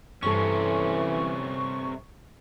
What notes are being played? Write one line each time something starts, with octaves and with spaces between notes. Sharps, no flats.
G2 C3 E3 A3 C#4 A4 C#6